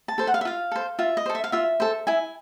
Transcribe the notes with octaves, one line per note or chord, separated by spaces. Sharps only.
A5
A4 C5
F#5
F5
E5
F4 F5
A4 C5
F4 E5
D#5
A4 C5
E5
F5
F4 E5
A4 C5
E4 G#5